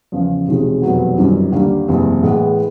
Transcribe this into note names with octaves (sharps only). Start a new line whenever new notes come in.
E2 C#3 F3
E1 E2 C3 D#3 G#3
F1 E2 B2 F#3 B3
G1 F#2 D#3 G3
D#2 D3 G3 A#3
F#1 E2 C3
A2 E3 G#3 B3